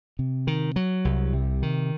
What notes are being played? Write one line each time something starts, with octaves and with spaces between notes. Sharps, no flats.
C3
D#3
F#3
C2
C3
D#3